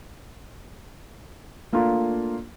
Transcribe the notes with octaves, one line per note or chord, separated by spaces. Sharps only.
A3 A#3 D4 F4